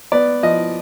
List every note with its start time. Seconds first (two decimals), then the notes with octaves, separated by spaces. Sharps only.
0.12 B3 D5
0.43 F3 D#5